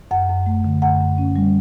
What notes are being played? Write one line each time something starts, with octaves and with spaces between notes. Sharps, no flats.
F#2 F#5
F#2
A3
D3
F#2 F#5
F#2
C#4
G3